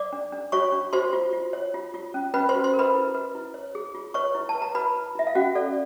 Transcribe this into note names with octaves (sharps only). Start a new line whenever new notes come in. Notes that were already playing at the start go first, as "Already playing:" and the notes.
Already playing: D5 D6
D4
D4
F#4 C#5 C#6
D4
F#4 C5 C6
F4
F4
C#5
F4
F4
C#4
C#4 B4 B5
C5 C6
F#4
C5 C6
A#4
B4 B5
E4
B4
E4
C#5
G#4
F4
B4 C#5 C#6
E4
A5
B4
A#5
E4 B4 B5
E4
E4 E5
F5
C#4 F#4 F#5
A4 D5